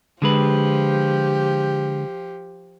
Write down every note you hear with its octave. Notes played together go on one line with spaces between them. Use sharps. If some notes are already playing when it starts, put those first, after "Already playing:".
D3 F3 G#3 G4 B4